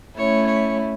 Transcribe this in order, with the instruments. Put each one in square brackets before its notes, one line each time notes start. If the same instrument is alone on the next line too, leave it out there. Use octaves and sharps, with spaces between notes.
[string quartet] A3 C#4 E4 [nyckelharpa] C#5
[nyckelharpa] C#5